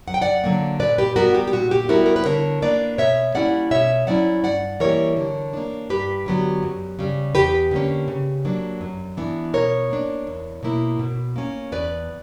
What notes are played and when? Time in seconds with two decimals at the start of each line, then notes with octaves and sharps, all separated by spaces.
0.07 F#2 F#5
0.14 G5
0.22 D5 F#5
0.44 D3 F#3 A#3
0.80 A#2 B4 D5
0.98 G4 B4
1.16 G3 B3 F#4 A#4
1.35 G4
1.47 G4
1.53 A#2 F#4
1.71 G4
1.89 G3 B3 E4 F#4 A#4
2.06 A#4
2.16 B4
2.25 D3 A#4 C#5
2.62 A#3 D4 B4 D5
2.98 B2 C#5 E5
3.35 G3 A#3 C#4 E4 D5 F#5
3.71 B2 C#5 E5
4.07 F#3 C#4 E4 D5 F#5
4.44 G2 D5 F#5
4.80 E3 G3 A#3 A#4 C#5
5.16 D3
5.53 A#3 D4
5.89 G2 G4 B4
6.26 D3 F#3 B3
6.63 F#2
6.99 C#3 G3
7.35 E2 G4 B4
7.71 D3 A#3 C#4
8.08 C#3
8.45 F#3 A#3 D4
8.81 F#2
9.17 E3 B3 D4
9.54 B2 A#4 C#5
9.90 A#3 D4
10.27 E2
10.63 B2 A#3 E4
10.99 B2
11.36 A#3 C#4
11.72 E2 B4 D5